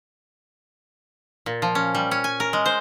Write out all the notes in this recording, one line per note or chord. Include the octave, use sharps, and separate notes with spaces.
A#2
F3
C#4
G3
C#4
G#5
A#4
G#3
C5